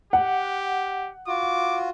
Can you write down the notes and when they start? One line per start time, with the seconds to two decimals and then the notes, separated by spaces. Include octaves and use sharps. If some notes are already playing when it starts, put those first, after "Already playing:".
0.13 G4 F#5
1.27 F4 F#4 D6